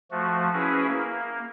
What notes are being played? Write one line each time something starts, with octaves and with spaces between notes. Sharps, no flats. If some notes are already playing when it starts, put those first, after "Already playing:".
F3 A3 F#4
C#4 E4 F#4 G#4 B4
A#3